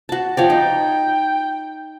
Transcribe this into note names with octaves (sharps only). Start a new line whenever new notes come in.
F#4 A5
F3 C#5 D5 G5
D#4